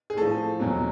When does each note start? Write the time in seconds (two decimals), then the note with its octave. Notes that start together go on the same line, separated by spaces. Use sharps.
0.10 G#4
0.17 A2 F3 A4
0.60 E2 B2 F#3